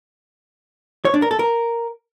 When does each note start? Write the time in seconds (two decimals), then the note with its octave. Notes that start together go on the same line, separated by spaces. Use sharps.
1.05 C#5
1.14 D4
1.22 A#4
1.31 A4
1.39 A#4